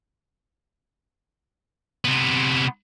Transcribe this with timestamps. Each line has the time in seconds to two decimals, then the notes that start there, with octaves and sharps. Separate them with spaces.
2.05 C3 B3